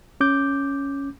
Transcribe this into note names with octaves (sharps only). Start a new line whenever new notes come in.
C#4 D6 G6